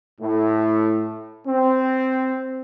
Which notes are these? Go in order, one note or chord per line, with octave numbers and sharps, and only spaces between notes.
A2
C4